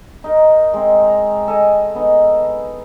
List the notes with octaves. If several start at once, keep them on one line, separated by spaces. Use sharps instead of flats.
D#4 A#4
G#3 C4
A#5
A4 D#5 G#5
B3 D#4